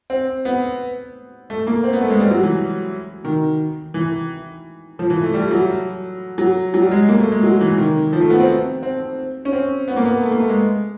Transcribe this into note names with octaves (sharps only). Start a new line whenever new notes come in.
C4
B3
A3
A#3
C4
B3
A3
G#3
G3
F#3
E3
D#3
E3
F3
E3
A3
G3
F#3
F#3
F#3
G3
G#3
A#3
A3
G#3
F#3
E3
D#3
F3
A3
B3
C4
C4
C#4
C4
B3
A#3
B3
A3
A#3
A3
G#3